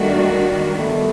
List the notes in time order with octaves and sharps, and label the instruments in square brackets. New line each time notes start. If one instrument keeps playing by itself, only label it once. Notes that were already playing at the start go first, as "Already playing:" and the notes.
Already playing: [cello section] D#3 G3 A#3 D4 F#4 [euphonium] A3
[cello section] D#3 G3 B3 [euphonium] A3